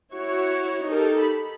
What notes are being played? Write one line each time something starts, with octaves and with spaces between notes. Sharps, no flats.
E4 F#4 C#5
D#4 G4 A4 A#4
B5